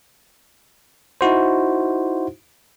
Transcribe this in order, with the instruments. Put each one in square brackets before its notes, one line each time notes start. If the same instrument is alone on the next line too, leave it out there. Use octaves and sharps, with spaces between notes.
[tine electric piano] D#4 E4 F#4 C5